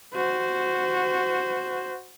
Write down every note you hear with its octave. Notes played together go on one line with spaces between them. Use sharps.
F#4 C5